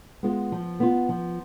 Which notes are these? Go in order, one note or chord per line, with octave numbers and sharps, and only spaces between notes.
G#3 B3 F4
F3
B3 F4
F3